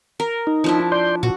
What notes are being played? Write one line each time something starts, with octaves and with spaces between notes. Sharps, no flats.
A#4
D#4
F3 D4 E4
D5 C6 G6
A#2 F#4